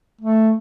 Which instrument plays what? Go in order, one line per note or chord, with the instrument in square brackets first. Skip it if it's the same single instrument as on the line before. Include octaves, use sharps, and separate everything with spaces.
[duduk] A3